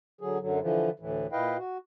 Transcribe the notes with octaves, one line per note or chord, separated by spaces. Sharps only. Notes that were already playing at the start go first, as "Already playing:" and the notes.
D3 F#3 G#4
F#2 D3 F#3
D3 E3 F3
D2 A2 E3
A#2 E4 B4 D#5 F5 G5
F#4